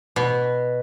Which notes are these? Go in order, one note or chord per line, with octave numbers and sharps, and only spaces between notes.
B2